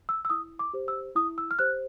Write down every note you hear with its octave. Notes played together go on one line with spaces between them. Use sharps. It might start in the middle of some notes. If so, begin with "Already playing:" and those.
E6
E6
E4 D#6
D6
G4 C5
E6
E4 D#6
E6
F6
G4 C5 F#6